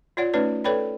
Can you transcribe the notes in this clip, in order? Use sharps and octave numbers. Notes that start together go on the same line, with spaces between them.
F4 C#5 D5 F#5
A3 C#4 D#4 B4 C#5 D5
A4 B4 C#5 D5 G5 B5